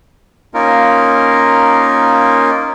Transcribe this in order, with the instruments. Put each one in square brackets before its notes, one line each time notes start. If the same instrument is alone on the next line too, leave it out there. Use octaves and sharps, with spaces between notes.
[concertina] A#3 C#4 D#4 F4 A#4